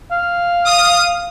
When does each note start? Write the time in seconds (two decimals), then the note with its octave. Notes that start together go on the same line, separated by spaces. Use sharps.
0.12 F5
0.66 D#6